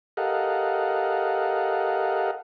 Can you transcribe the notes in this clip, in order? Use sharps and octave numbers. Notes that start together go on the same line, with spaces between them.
G4 A4 A#4 D#5 F5 F#5